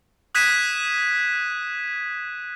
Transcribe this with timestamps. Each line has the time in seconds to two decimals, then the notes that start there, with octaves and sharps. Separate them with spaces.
0.35 D#6 F#6 G#6 B6 D#7 E7